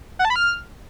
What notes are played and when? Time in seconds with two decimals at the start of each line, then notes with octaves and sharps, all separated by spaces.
0.19 F#5
0.25 A5
0.30 B5
0.36 F6